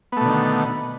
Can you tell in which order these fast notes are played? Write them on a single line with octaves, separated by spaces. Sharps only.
B3 A3 B2 D3 D#3